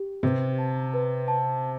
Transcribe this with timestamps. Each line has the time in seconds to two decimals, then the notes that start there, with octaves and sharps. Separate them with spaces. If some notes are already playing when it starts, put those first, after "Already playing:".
Already playing: G4
0.23 C3 B4
0.59 A5
0.94 B4
1.28 A5